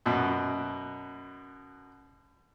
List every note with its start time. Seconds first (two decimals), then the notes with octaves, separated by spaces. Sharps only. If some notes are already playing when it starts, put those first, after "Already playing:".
0.06 F#2 B2